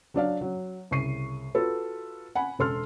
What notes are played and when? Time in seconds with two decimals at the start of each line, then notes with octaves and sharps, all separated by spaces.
0.14 F#3 D4 D5 F5
0.41 F#3
0.91 C2 C#3 C#6 C7 D#7
1.55 F4 F#4 A4 B4
2.35 F#5 G#5 B5
2.59 E1 A4 C6 F6